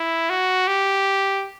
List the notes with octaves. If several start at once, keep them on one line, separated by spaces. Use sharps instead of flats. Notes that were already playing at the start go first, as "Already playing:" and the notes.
Already playing: E4
F#4
G4